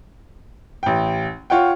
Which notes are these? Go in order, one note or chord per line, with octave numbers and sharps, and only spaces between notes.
A1 G5
F4 C#5 F#5 G5